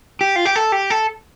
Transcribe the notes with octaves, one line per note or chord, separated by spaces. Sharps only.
G4
F4
G4
A4
G4
A4